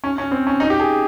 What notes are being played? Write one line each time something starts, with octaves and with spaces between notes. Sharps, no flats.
C#4
C#4
C4
C#4
D#4
G4
G#4